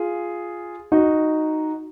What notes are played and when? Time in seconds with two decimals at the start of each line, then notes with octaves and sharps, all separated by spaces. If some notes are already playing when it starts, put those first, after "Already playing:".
Already playing: F4 G#4
0.92 D#4 F#4